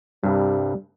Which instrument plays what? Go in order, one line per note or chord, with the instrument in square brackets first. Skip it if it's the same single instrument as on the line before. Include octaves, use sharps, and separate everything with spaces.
[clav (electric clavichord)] C2 G2 [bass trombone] G3